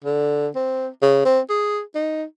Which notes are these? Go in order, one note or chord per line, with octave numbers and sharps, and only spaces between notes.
D3
C4
C#3
C4
G#4
D#4